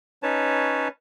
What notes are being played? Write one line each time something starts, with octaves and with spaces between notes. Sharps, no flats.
C#4 D#4 B4 C#5 A5